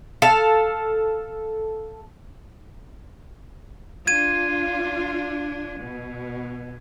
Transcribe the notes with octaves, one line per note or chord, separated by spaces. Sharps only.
A4 F5
D4 F4 G#6 D#7
B2